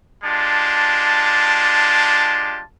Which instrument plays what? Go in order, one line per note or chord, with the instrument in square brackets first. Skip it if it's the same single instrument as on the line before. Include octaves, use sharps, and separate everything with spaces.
[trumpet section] G#3 D4 F4 G4 A5